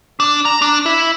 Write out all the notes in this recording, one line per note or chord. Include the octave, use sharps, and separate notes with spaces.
D4
A#5
D4
E4